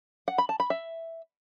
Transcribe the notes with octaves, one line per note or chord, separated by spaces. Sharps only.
F#5
B5
A5
B5
E5